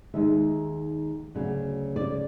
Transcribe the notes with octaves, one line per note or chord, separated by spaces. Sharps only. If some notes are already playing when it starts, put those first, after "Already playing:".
D#2 D#3 G#3 E5
D2 C#3 F#3
D5